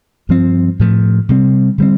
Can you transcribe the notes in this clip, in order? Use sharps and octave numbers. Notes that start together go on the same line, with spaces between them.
G2 F3 C4
A2 F3 A3
C3 G3 C4
D3 G3 C4